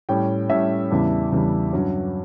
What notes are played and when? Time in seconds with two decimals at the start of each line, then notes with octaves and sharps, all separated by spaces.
0.09 A2 G3 C#4 G5
0.49 A2 G3 C#4 E5
0.90 E2 C#3 E3 G3 D4
1.32 E2 C#3 E3 G3 D4
1.73 G2 F#3 C#4